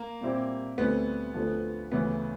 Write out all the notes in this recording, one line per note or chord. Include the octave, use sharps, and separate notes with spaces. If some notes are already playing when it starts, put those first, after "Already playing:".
Already playing: A#3
A#2 G3 C4 E4 G4
D2 D3 G3 B3 C4 E4
D2 D3 F3
D2 C#3 E3 B3